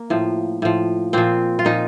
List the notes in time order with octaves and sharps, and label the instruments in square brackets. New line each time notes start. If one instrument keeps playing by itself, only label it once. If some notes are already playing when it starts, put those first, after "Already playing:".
Already playing: [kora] A#3
A2 F3
A2 F3
A#2 F3 C4
F4
A#2 F3 D#4